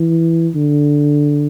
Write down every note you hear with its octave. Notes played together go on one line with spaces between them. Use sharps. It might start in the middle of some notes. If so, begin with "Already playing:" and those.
Already playing: E3
D3